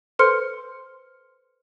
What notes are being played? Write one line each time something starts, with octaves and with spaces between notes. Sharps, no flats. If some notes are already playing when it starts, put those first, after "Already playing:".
A4 B4 C5 C6 F6 C#7